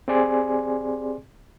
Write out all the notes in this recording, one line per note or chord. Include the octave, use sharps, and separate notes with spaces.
C4 G4 G#4 D5 G#5 C6